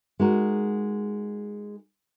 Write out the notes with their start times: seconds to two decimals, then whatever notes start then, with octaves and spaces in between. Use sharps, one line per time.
0.19 G#3 D#4 F#4 A#4